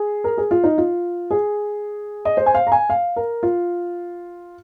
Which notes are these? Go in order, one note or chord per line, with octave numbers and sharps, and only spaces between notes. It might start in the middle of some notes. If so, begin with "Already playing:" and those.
Already playing: G#4
A#4
G#4
F4
D#4
F4
G#4
D#5
C5
G#5
F5
A#5
G#5
F5
A#4
F4